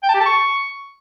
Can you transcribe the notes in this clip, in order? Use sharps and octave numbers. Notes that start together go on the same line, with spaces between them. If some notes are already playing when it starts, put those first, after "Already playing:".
G5
A5
G4
A5
C#6